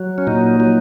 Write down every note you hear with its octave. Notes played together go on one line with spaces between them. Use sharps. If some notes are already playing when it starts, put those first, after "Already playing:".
Already playing: F#3
C#4
A#2 D#4
F#3